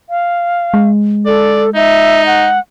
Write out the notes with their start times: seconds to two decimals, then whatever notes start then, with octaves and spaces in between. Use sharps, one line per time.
0.09 F5
0.74 G#3
1.26 A4 D5
1.75 D#4 E5
2.26 F#5